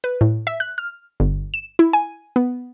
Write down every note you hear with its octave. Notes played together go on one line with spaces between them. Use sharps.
B4
A2
E5
F#6
F6
G1
E7
E4
G#5
B3